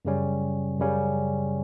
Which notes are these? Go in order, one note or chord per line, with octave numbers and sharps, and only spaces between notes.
F#2 C#3 G3 C#4
F#2 C#3 G3 C#4